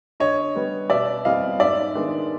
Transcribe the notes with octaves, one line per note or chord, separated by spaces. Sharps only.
D3 C#5 D#5
G3 B3
B2 D5 E5
G3 C4 E4 D#5 F5
G#2 D5 E5
D#3 G#3 B3 D4